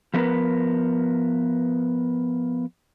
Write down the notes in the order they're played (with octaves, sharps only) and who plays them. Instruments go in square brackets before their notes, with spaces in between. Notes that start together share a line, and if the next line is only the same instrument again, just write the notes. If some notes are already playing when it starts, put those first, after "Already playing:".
[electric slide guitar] F3 A3 B3 C#4 A#4 B4